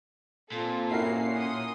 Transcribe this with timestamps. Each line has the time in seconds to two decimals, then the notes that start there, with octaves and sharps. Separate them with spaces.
0.52 A#2 C4 F4 A4
0.91 C#4 E4 F#4 A#4 C7
1.34 F#5 C6 D#6